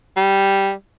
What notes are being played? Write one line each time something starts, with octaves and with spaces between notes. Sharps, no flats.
G3